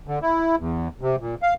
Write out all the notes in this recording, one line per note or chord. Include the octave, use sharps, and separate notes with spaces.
D3
E4
E2
C3
A#2
F5